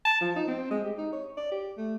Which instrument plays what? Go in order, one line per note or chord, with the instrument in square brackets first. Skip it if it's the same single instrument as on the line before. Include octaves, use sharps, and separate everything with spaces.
[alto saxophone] A5
F3
D#4
C4
G#3
G4
D#4
C#5
D5
G4
A3